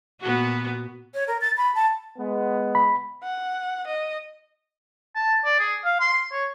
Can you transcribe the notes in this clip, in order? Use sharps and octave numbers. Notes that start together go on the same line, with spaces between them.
A#2 B3 F#4
C#5
A#4
A6
B5
A5
G#3 B3
B5
F#5
D#5
A5
D5
G#4
F5
C6
C#5